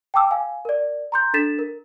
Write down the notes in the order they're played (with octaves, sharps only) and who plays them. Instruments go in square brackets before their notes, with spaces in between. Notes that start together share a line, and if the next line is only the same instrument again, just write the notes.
[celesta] G5 A5 D6 E6
F5 G#5
A#4 D5
A#5 C6 G6
D4 A4 A6 B6 E7
A#4